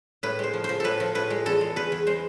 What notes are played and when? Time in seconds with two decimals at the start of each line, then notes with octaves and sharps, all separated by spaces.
0.23 A2 B4
0.39 G#3 C5
0.53 F3
0.64 F3 C5
0.80 A2 A4 B4
1.00 F3
1.15 A2 B4
1.30 G#3
1.46 E2 A4
1.61 G#3
1.76 E2 B4
1.92 E2
2.07 G#3 C5